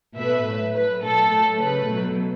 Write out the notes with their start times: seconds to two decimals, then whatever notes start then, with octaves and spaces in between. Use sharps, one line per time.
0.18 B2 A3 B4 E5
0.46 A2 F#3 A3
0.74 A2 F#3 A3 B4
1.02 B2 F#3 A3 A4
1.32 A2 F#3 A3
1.59 C#3 A3 B4
1.88 B2 F#3 A3